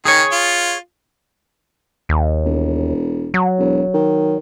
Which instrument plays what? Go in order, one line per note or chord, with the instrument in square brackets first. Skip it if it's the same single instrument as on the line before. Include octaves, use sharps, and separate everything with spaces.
[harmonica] D#3 [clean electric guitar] G#4 C#5
[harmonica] F4
[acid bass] D#2
[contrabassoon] E1
[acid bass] F#3
[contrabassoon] E1
D#3